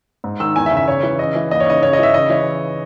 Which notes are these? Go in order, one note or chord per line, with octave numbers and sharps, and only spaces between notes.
G#2
D#3 E6
E2 G#5
E5
C#3
E5
C#3 C#5
E3
C#3 D#5
E3
D#2 D#5
C#5
C#3 D#5
C#3 C#5
D#5
E3 E5
C#3 D#5
E3 C#5